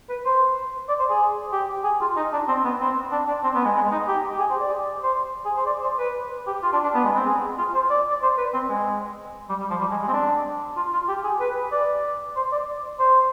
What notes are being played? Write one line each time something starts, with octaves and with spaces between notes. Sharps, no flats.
B4
C5
D5
C5
G#4
G4
G#4
F4
D#4
D4
C4
B3
C4
D4
D4
C4
B3
G#3
G#3
D#4
G4
G4
G#4
C5
D5
C5
G#4
C5
D5
C5
B4
G4
F4
D4
D4
B3
G#3
C4
G#4
F4
C5
D5
D5
C5
B4
C4
G#3
G3
G3
F3
G3
G#3
G#3
C4
D4
F4
F4
G4
G#4
B4
D5
C5
D5
C5